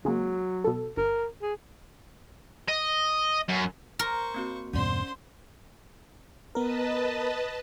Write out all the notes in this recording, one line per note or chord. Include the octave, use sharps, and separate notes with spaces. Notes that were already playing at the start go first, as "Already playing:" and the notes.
C#3 F#3 G#3 A#3
B2 A4
G1 A#4
G#4
D#5
F#2
A#4 C5 C#6
A#3 C4 F#4
E2 G2 B2 C#4 C5 D5 C6
B3 A#4 B4 D#5 A5